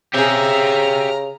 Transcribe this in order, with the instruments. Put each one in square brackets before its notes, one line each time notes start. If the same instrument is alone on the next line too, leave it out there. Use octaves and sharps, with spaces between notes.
[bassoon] C#3 [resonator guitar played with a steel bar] C4 G#4 [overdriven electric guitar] G4 E5 [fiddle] A#5 F6